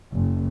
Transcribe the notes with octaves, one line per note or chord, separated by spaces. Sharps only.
F#1